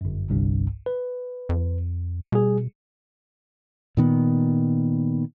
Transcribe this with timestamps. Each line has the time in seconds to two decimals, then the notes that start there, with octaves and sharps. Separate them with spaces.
0.01 G1 F#2
0.29 G1 C2 G2
0.86 B4
1.49 F2
2.32 B2 G3 G#4
3.97 A#2 D#3 B3